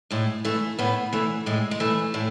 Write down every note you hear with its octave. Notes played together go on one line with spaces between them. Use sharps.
A2 G#3
E3 A3
A2 B3
E3 A3
A2 G#3
G#3
E3 A3
A2